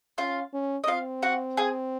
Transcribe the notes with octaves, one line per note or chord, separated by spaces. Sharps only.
C#4 F4 F5
C#4
D#5
C4 F4 F5
F#4 F#5
G#4 G#5